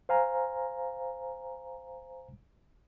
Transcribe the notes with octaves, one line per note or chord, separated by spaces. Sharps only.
C5 F5 G#5 A#5